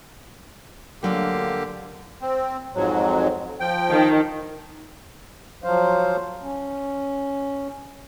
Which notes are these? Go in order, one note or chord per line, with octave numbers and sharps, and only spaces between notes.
D2 D3 F#3 A#3 F4 G4
C4
F2 G#2 F#3
F3 G5
D#3
F3 F#3 C5 F5
C#4